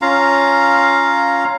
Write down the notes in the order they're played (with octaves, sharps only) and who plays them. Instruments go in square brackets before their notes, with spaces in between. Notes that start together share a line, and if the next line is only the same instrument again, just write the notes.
[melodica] C#4 F4 F5 A#5